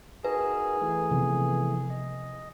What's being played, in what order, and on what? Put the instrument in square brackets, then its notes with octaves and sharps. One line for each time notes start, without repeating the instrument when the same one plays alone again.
[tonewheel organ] D#4 F#4 A#4 [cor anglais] G#4 [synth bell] B4
[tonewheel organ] E3 A3
[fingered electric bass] C3 F3 B3
[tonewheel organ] D#5